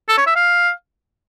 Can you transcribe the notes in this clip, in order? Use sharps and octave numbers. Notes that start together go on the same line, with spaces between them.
A4
C#5
E5
F5